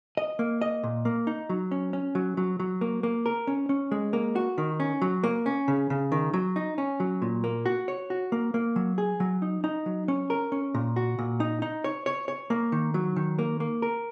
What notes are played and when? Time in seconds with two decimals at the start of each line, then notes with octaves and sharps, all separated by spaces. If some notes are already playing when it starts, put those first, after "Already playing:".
0.17 D#5
0.39 A#3
0.62 D#5
0.83 A#2
1.05 A#3
1.27 D#4
1.49 F#3
1.71 C#4
1.93 C#4
2.15 F#3
2.37 F#3
2.60 F#3
2.81 A#3
3.03 A#3
3.26 A#4
3.47 C#4
3.69 C#4
3.91 G#3
4.13 A#3
4.36 F#4
4.58 D#3
4.80 C#4
5.02 F#3
5.24 A#3
5.46 C#4
5.68 C#3
5.90 C#3
6.12 D#3
6.33 F#3
6.56 D#4
6.78 C#4
7.00 F#3
7.22 A#2
7.44 A#3
7.66 F#4
7.88 C#5
8.10 F#4
8.32 A#3
8.54 A#3
8.76 F#3
8.98 G#4
9.20 F#3
9.42 D#4
9.64 D#4
9.86 F#3
10.08 C#4
10.30 A#4
10.52 C#4
10.74 A#2
10.96 F#4
11.19 A#2
11.40 D#4
11.62 D#4
11.84 C#5
12.06 C#5
12.28 C#5
12.50 A#3
12.72 D#3
12.94 F#3
13.16 D#3
13.39 A#3
13.60 A#3
13.82 A#4